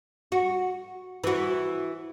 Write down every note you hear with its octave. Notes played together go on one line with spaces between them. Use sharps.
F#4
E3 F#4